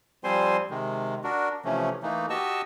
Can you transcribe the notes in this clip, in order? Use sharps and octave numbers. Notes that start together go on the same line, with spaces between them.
F3 G3 C4 C5 G#5 C6
C3 D#3 G#3
D4 F#4 A#4
C3 E3 F3 A3 C#4
E3 A3 A#3 D#4
F#4 G4 D#5 A5 C#6 E6